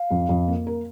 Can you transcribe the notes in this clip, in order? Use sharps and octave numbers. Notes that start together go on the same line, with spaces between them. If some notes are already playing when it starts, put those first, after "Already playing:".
Already playing: F5
F2
F2
A#3
A#4